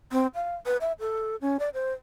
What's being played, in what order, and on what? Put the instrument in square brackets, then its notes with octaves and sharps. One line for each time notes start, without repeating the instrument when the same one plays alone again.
[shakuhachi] C4
F5
B4
E5
A4
C#4
D5
C5